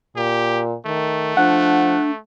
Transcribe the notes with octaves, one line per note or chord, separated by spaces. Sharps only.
A#2 G4
D#3 A3
F3 D4 F#5